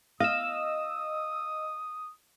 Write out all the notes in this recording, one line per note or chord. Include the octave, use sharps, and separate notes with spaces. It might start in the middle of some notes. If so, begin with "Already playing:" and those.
D#5 F5 D#6 E6